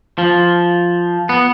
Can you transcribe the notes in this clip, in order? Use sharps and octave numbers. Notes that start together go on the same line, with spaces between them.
F3
B3